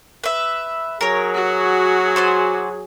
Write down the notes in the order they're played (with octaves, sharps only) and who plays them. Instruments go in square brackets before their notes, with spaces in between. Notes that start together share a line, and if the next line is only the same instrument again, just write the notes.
[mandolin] B4 E5
[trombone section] F#3 G#4 [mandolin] A#4 C#5
[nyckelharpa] F#4
[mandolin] C5 D5 G#5